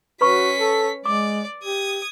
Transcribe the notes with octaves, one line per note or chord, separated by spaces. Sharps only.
C#4 F#4 B4 B5 C#6 B6
A4
G#3 D5 D6
G4 D#6 G#6